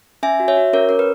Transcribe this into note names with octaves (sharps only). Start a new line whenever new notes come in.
C#4 E5 G#5
F#4
C#5 E5
F#4
C#4 A#4 C#5
C#4 A#4
B4